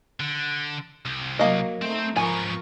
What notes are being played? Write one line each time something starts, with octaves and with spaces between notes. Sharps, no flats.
D3
C2
F#3 A#3 D#5
A3 C4 D#4 C5
G#2 F3 B3 A#4 G#5 C#6